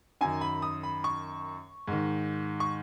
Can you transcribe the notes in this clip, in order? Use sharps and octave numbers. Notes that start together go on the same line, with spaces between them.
F#2 D#3 G#5
B5
D#6
B5
C#6
G#2 D#3
C#6